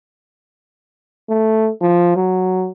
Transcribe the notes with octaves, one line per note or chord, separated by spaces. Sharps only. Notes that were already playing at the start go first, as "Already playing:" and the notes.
A3
F3
F#3